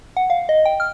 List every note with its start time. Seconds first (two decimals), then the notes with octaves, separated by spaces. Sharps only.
0.17 F#5
0.30 F5
0.49 D#5
0.65 G5
0.80 F6